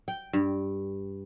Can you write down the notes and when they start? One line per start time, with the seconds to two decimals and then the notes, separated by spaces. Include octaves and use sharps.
0.08 G5
0.33 G2